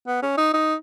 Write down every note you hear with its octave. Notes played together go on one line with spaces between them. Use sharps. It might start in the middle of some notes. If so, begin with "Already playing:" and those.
B3
C#4
D#4
D#4